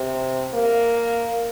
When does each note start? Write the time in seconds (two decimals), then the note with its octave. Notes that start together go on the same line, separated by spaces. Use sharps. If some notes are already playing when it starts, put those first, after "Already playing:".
Already playing: C3
0.54 A#3